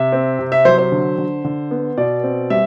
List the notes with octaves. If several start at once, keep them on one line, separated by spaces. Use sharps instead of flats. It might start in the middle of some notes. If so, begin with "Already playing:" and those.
Already playing: C3 E5
C4
C3
E5
F#3 C5
C5
D3
D3
D3
B3
B2 D5
C4
G3 E5